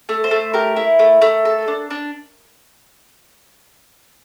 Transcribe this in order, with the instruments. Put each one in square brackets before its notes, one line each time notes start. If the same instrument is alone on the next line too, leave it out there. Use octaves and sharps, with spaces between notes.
[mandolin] A3
C5
A3
G4 A#4
E4
A3
A3
A4
D4
D4